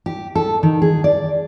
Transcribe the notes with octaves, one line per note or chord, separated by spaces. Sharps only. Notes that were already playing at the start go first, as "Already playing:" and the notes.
G4
A4
D#3
G#4
D5